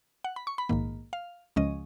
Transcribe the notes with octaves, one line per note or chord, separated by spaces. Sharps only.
F#5
B5
C#6
B5
A#1 G#2 D#3 A#3
F5
C#2 C#3 F3 G#3 C#4 D#5